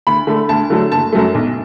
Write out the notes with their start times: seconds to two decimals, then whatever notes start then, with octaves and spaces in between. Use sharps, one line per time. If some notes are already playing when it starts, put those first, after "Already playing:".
0.07 D2 B5
0.27 D3 A3
0.49 D2 A5
0.70 D3 F#3 A3
0.92 F#1 A5
1.12 F#2 F#3 A3
1.34 B1